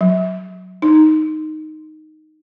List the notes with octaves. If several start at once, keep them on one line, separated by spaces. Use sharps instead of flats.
F#3
D#4